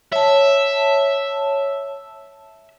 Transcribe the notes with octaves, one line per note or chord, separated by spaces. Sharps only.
C#5 E5 A5